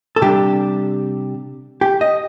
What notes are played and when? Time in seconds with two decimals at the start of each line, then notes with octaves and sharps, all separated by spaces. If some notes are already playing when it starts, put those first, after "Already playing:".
0.16 A4
0.22 C3 G3 D4 G4
1.81 G4
2.01 D#5